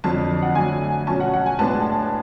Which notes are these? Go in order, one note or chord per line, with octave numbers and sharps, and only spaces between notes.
F2 D3 F#3 A5
F#5
D3 F#3 A3 G#5
B2 F#3 C#4 A5
F#5
F#5
G#5
A2 G#3 B3 D4 A5